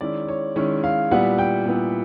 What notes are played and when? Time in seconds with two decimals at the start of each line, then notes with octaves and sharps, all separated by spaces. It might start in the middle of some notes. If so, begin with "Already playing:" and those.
0.01 D#3 G#3 C#4 E4 D5
0.28 C#5
0.56 D#3 G#3 C#4 E4 C#5
0.84 F5
1.11 A#2 G3 B3 E4 F#5
1.38 G5
1.66 A#2 G3 B3 E4